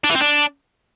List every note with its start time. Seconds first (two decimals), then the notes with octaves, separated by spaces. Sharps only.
0.04 D4
0.10 E3
0.15 C4
0.21 D4